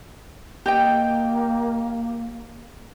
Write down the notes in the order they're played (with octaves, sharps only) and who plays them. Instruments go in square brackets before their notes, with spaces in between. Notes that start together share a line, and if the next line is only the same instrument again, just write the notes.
[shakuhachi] A#3 [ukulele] G4 D#5 G5